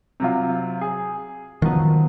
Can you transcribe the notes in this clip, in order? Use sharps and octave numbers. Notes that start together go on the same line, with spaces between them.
C3 F#3 F4
G#4
D#3 F3 F#3 B3